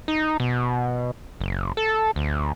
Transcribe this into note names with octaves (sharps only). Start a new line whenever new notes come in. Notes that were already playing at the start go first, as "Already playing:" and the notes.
D#4
B2
F#1
A4
D2